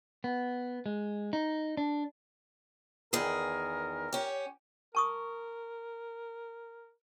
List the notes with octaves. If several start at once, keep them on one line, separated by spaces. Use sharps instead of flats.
B3
G#3
D#4
D4
E2 D#3 G#4 A#4
C#4 G4
A#4 A5 C#6 D#6